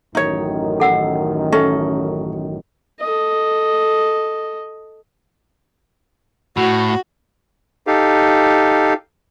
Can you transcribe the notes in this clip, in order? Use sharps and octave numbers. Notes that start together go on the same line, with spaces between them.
A1 F#2 D#3 D#4 C#5
A4 F#5 E6
C#4 A4 E5
A4 D#5
A2 F#4
D#4 G4 A4 F5